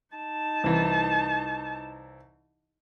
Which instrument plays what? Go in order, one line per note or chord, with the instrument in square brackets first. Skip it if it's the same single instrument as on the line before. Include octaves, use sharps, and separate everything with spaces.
[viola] D#4 A5
[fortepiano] C2 E3